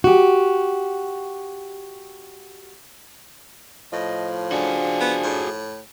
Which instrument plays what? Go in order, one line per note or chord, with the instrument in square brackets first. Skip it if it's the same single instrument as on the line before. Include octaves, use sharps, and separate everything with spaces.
[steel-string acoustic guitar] F#4 G4
[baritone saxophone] A2 [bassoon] F3 [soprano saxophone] D#5
[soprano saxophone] D4 [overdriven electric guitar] F#4 G#4
[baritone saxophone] B3
A2